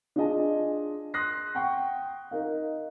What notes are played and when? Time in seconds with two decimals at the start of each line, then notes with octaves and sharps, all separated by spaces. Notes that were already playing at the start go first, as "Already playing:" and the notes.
0.16 D4 F4 G#4 D#5 G#5 A5
1.14 C6 D#6 F#6 A#6 C7
1.55 F#5 G5 C#6
2.31 D#4 A#4 F5